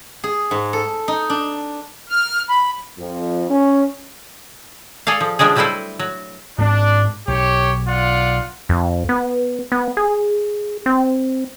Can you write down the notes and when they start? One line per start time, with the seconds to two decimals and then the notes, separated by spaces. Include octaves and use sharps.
0.24 G#4
0.51 G#2
0.73 A4
1.08 D#4
1.30 D4
2.08 F6
2.48 B5
2.99 F2
3.50 C#4
5.07 G#4 A4 D5 F5
5.20 F3
5.39 C#3 F3 G3 G#3 D4 G#4
5.56 F#3 G3 A3 E4 B4 C5
5.99 F#3
6.58 G#2 C4 D4
7.28 B1 G4 C#5
7.88 F4 D5 F#5
8.69 F2
9.09 B3
9.72 B3
9.97 G#4
10.86 C4